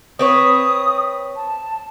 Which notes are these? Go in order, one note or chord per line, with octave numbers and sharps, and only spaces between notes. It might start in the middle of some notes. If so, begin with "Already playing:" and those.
C4 B4 C#5 D#6
A5